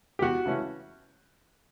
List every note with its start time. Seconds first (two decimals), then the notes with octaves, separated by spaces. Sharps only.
0.19 G4
0.22 E2 F#4
0.46 C#3 E3 A3 C#4